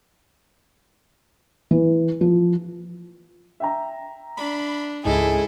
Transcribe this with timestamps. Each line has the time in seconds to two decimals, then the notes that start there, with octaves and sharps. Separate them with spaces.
1.71 E3
2.21 F3
3.60 E5 G5 A#5
4.37 D4 B5
5.05 C#2 G#2 D#4 E4 G#4 A4